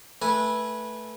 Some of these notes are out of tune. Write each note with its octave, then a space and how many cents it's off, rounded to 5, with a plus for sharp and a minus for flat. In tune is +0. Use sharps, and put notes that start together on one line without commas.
A3 +0 B4 -15 G#5 +0